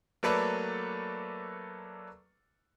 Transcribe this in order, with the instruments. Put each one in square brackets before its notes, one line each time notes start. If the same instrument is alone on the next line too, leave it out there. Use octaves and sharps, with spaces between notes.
[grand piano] F#3 A3 A#3 A4 B4 D5